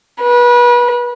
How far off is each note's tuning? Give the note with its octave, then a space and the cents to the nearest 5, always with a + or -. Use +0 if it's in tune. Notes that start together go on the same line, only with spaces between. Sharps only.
B4 -30